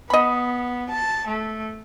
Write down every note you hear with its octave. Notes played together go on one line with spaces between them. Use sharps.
B3 D#5 B5
A5
A3